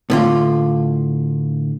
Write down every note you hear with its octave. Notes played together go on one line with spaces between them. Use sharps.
A2 D3 F4